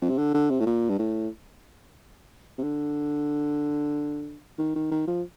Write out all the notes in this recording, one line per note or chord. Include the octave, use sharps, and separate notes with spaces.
F2
C3
D3
D3
C3
A2
A#2
G2
A2
C3
D3
D#3
D#3
D#3
F3